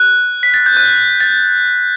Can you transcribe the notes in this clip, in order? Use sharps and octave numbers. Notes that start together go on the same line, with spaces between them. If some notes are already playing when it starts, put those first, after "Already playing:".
Already playing: F#6
B6
A6
G6
F#6
A6